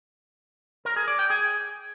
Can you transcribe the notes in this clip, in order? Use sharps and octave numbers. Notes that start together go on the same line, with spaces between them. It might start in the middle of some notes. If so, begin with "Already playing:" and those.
A#4
G#4
D5
G5
G#4